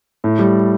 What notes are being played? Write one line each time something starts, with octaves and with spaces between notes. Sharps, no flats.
A2
G3